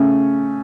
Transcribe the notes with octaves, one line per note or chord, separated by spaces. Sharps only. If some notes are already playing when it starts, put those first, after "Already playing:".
Already playing: C#3 A3 C#4